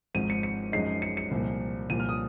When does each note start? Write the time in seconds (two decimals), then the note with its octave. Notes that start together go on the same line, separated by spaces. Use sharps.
0.14 G#1 G#2 F3 C4 D#7
0.30 C#7
0.43 C#7
0.72 F#2 F3 G#3 D#4 C7
1.02 C#7
1.17 C#7
1.31 C2 A#2 F3
1.89 C2 A#2 F3 D#7
2.00 F6
2.09 D#6